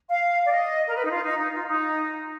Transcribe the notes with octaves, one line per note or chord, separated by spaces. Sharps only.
F5
D5
D#5
A#4
B4
D#4
F4
D#4
D#4
F4
D#4